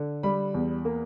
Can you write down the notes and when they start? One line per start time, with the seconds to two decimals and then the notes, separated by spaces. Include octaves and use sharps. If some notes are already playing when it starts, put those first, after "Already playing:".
Already playing: D3
0.23 G3 B5
0.54 E2
0.85 A#3